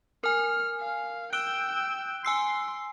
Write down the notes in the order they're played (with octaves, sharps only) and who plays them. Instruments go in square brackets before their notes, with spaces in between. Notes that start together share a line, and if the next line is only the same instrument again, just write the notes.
[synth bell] A#4 G#5 [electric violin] F6
[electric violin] F5
[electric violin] G5 E6 [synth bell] F#6 D7 G7
[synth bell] G#5 E6 C7 [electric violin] C6